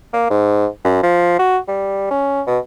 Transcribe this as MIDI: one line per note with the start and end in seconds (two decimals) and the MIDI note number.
0.13 0.28 58
0.30 0.67 44
0.85 1.00 42
1.03 1.38 53
1.39 1.58 66
1.68 2.06 55
2.11 2.42 61
2.47 2.59 47